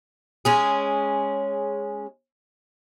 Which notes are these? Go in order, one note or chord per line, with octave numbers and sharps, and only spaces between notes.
G#3 C#4 G#4